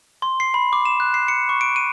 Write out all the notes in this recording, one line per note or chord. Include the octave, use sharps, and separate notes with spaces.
C6
C7
B5
D6
E7
F#6
C7
C#7
C#6
D7
D#7